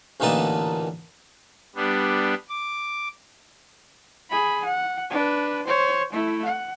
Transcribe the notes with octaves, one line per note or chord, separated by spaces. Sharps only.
A1 A#2 D3 D#4 B4 A5
G3 B3 D4
D6
G#4 B5
F#5
D4 B4
C5 C#5
A3 E4
F#5